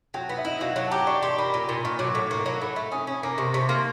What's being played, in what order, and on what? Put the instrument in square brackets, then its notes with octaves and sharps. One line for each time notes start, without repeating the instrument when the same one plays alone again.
[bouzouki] F#3 [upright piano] G5
[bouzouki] B3 [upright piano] F#5
[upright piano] E5
[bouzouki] E4 [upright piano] D#5
[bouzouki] F#3 [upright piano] F5
[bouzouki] F#3 [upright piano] F#5
[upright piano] A5
[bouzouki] G4 [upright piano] A#5
[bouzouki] D4 [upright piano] C#6
[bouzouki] G4 [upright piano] C6
[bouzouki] A#3 [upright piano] B5
[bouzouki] A#2 [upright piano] B5
[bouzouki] A#2 [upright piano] C6
[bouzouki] A#2 [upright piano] C#6
[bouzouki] F#3 [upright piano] D6
[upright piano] C#6
[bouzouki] A2 [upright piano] D6
[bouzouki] A#3 [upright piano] C#6
[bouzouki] F#3
[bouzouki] A3 [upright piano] B5
[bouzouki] A3
[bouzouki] C#4 [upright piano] D#6
[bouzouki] C#4
[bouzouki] A#3 [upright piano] D6
[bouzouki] C3 [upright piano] C#6
[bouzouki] C3 [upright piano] C#6
[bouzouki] A#3 [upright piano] C6